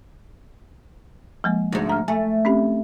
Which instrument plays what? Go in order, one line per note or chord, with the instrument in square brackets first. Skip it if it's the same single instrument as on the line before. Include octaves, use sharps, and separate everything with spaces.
[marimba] F3 G#3 A#3
[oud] D2 G#2
[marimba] A#5 F6
[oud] A3 [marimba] G#5
[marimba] C4 C#4 G4